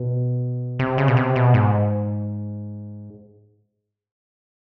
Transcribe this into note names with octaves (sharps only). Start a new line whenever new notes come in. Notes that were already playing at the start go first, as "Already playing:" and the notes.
Already playing: B2
C3
C#3
B2
C3
B2
G#2